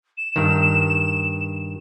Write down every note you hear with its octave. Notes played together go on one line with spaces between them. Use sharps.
E7
G2 D#3